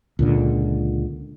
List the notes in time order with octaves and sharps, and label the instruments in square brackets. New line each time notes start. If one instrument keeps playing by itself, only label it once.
[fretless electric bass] C#2 A#2 D3